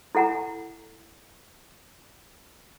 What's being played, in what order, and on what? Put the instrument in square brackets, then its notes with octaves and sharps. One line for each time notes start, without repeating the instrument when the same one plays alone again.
[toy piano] E4 A4 F#5 G#5 A#5